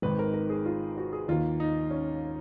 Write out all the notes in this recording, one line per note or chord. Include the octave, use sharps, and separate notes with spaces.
G#1 G#2 D#3 B4
A#4
A#4
G#4
F4
F#4
G#4
D#2 D#3 A#3 F4
D#4
C#4